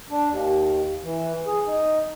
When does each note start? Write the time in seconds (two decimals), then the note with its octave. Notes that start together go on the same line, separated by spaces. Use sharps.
0.10 D4
0.29 D#2
1.04 E3
1.46 G#4
1.67 D#4